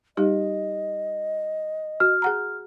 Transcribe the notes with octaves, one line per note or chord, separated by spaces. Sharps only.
G3 D#4 G4 D#5
F#4 F6
G#4 F#5 A#5